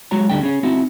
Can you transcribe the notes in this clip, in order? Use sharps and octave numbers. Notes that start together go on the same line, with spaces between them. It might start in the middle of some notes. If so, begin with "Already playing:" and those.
F#3 G#3 F#4 C#5 A#5
D2 G3 D4 A4 G5
C#4 G#4 C#5
C4 D#4 E4 F#4